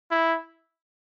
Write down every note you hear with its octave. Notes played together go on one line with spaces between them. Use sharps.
E4